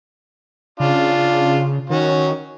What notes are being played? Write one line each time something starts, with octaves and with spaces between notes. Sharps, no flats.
C#3 D4 F4
D#3 C#4 F#4